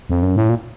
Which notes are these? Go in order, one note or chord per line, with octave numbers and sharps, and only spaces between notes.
F2
F#2
A2
A#2